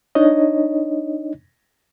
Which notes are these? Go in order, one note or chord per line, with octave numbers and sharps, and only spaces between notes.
D4 D#4 C#5 D#5